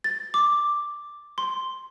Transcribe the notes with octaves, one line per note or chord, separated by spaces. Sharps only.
A6
D6
C6